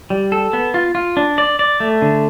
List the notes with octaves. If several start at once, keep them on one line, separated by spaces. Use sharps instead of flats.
G3
A4
B3
F4
F4
D4
D5
D5
A3
D3